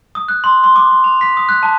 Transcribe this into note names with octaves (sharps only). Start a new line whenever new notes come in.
D#6
F#6
C6
C6
D6
C6
F7
B6
D#6
F#6
A5